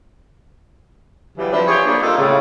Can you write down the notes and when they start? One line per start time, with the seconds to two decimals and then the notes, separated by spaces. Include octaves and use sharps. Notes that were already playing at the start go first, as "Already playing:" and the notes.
1.38 C#3 E3 F#3 G3
1.53 F3 C4 D4 E4 B4
1.68 F4 G4 G#4 C#5
1.86 A#3 D4
2.02 C3 G3 D#4 F4 A4
2.18 A2 C#3